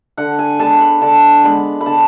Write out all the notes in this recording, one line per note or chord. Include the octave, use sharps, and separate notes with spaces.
D3 F#5
G#5
G#3 B3 D4 A5
B5
D3 A5
G#3 B3 D4 B5
B5
D3 A5